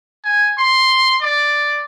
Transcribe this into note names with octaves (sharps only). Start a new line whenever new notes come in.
G#5
C6
D5